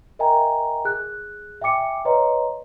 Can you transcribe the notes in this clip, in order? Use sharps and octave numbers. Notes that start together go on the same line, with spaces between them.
A#4 D#5 E5 G5 G#5 A#5
G#4 F#6
E5 G5 G#5 D6 C#7
B4 C#5 D#5 A#5 C6